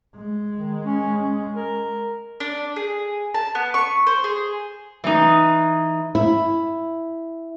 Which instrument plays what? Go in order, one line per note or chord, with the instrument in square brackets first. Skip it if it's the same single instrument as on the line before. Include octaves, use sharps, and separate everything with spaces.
[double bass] G#3
[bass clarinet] D#3
C#4
C#4
A#4
[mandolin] D4
G#4
A5
B3
C#6
C5
G#4
[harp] E3 D#4
[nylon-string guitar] E4